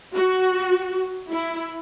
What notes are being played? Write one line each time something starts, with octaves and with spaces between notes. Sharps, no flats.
F#4
E4